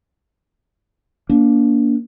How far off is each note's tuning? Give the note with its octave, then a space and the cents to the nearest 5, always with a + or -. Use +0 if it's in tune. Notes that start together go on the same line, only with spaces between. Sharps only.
A#3 +15 D4 -30